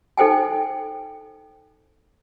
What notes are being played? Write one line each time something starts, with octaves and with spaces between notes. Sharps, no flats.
D#4 A4 C5 G5 G#5